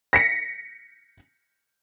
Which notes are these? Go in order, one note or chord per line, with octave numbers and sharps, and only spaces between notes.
A#6 B6 C#7